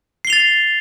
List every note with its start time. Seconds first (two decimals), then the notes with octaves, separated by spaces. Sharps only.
0.25 C7
0.27 G7
0.30 F7
0.33 A6